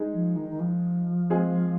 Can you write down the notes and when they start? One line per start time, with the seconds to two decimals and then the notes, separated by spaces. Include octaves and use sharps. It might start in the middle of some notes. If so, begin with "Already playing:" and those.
Already playing: G#3 D#4 G#4
0.13 F3
0.36 D#3
0.49 D#3
0.60 F3
1.30 G#3 C4 F4 G#4